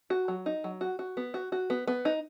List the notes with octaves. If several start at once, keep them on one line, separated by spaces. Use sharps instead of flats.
F#4
F#3
D#4
F#3
F#4
F#4
B3
F#4
F#4
B3
B3
D#4